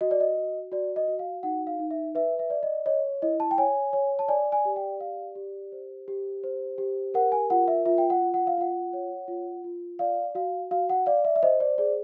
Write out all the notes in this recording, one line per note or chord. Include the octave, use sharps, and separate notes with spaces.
F#4 D#5
D5
D#5
F#4
F#4 D5
D#5
F#4
F5
D#4 F#5
F5
D#4
E5
B4 E5
E5
D5
D#5
C#5 D#5
E4 D#5
A5
G5
C#5 G#5
C#5
A5
D5 G#5
G#5
G4
G5
D5 F5
G4
C5
G4
C5
G4
A#4 F#5
G#5
F4 F#5
E5
F4 E5
G5
F#5
F4
F#5
F5
F4 F#5
C#5
F4
F4
D5 F5
F#4 F5
F#4 F5
F#5
D5 F5
E5
E5
C5 D#5
D5
G#4 D5